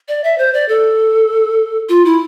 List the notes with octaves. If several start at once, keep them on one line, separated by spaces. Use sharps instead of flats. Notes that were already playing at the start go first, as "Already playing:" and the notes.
D5
E5
C5
D5
A4
F4
E4